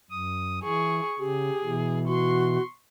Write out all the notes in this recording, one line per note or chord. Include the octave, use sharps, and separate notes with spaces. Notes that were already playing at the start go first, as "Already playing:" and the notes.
F#2 D#6
E3 G#4 C#6
C#3 G4 G#4
B2 E3
F#4 C6 C#6